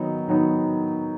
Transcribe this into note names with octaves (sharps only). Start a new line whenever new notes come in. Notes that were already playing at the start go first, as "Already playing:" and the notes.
Already playing: D#3 F#3 B3 D#4
D#3 F#3 B3 D#4